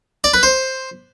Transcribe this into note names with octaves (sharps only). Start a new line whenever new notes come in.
D5
B4
C5